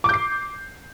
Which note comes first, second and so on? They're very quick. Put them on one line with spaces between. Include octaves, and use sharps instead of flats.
D6 G6 C7